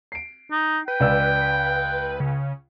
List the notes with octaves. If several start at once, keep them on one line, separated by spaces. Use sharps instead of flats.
C7 D7
D#4
B4 G5
C#2 D5 E6
C#3